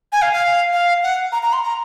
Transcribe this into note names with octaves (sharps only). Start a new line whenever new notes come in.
G#5
F5
F5
F5
F#5
A#5
A#5
C6
A#5